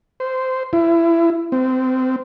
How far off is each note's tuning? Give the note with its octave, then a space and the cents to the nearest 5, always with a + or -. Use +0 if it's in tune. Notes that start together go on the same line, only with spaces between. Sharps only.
C5 -15
E4 +25
C4 -25